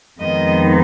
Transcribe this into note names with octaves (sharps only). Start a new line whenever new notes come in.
F2 D#3 G#3 B3 D#4 D#5